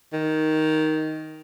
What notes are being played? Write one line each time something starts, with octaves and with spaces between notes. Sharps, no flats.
D#3